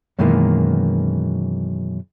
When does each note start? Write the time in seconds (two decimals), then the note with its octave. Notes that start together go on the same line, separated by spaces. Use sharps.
0.19 F#2 B2 D#3 E3 G#3 A#3